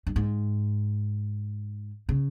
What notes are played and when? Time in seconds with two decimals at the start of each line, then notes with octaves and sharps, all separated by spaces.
0.07 G2
0.16 G#2
2.09 C#3